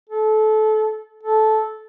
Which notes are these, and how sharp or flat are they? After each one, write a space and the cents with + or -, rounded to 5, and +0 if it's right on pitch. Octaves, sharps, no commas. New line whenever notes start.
A4 -25
A4 -15